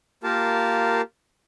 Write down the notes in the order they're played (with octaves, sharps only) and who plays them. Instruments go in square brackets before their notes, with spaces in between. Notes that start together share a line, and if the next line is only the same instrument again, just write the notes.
[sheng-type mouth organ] A#3 F4 G4 A#4 F5 A5